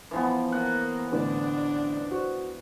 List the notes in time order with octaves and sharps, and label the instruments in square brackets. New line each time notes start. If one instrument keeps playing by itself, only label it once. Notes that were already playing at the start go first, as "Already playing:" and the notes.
[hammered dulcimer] E3 F3 B3
[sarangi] A#3 [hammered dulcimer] F#5
[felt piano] A1 D3 B4 [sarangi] D4
[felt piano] F#4 C5